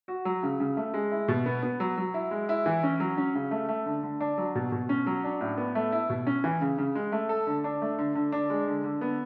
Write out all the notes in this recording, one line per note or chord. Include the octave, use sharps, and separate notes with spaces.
F#4
F#3
C#3
C#3
A3
G#3
E4
B2
B3
B3
F#3
F#3
E4
G#3
E4
E3
C#4
F#3
C#4
C#3
A3
A3
D3
D3
D4
F#3
B2
B2
C#4
F#3
D4
A2
B3
A3
E4
B2
C#4
E3
C#3
C#3
G#3
A3
A4
D3
D4
A3
D3
D3
D4
G#3
D3
D3
B3